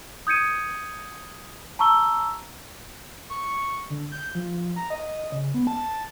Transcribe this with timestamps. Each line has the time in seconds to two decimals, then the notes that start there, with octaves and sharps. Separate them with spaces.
0.27 D#6 G6 G#6 C#7 D#7
1.79 A5 A#5 C#6 E6 G7
3.30 C#6
3.90 D3
4.12 G6
4.35 F3
4.76 A#5
4.90 D#5
5.32 C#3
5.54 B3
5.67 A5